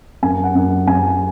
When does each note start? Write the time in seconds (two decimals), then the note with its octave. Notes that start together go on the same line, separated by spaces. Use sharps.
0.23 F#2 G#5
0.44 F#5
0.55 F#2
0.87 F#2 G#5